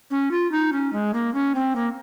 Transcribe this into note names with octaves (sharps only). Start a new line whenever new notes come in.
C#4
F4
D#4
C#4
G#3
A#3
C#4
C4
A#3